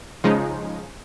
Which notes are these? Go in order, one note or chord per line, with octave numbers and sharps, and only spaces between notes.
C#3 F3 G#3 D#4